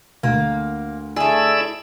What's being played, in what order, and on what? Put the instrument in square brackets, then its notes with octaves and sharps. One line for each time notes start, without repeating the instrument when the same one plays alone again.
[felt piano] D2 [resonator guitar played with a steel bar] A#3
[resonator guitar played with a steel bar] A3 G#4 [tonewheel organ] E4 D5 E6